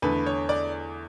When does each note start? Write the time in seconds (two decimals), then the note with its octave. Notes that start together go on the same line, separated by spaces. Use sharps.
0.02 E2 D3 A3 B4
0.26 C#5
0.49 D5